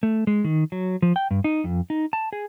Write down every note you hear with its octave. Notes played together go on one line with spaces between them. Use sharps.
A3
G#3
D#3
F#3
F3
G5
G2
D#4
F2
D#4
A5
G#4